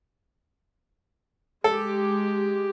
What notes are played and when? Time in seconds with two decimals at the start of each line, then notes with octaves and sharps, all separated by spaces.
1.64 G#3 G4 A4